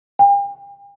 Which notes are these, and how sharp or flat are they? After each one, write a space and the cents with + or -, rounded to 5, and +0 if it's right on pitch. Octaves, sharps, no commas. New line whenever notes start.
G5 +45